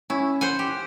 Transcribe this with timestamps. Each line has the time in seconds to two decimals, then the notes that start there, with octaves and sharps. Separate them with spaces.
0.10 C#4 E4
0.41 C5 F#5 G#5
0.59 G4